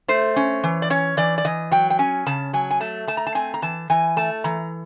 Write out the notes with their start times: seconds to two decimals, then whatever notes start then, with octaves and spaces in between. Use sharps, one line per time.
0.08 A3 C5
0.36 C#4
0.64 E3
0.82 D5
0.90 C#4 C#5
1.17 E3 D5
1.38 D5
1.45 E3 D#5
1.72 F#3 G5
1.90 G5
1.99 C#4 G#5
2.26 C#3 A5
2.53 F#3 G#5
2.71 G#5
2.80 A3 A5
3.07 A3 A5
3.17 A#5
3.27 A5
3.35 C4 G#5
3.54 A#5
3.62 E3 A5
3.90 E3 G#5
4.17 A3 A5
4.44 E3 A#5